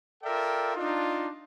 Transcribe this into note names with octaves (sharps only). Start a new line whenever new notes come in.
F4 A4 A#4 D5 E5 G5
D4 D#4 F4